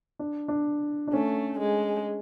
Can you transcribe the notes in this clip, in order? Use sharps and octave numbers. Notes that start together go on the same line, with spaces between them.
D4
D4
D4
A3 C#4
G#3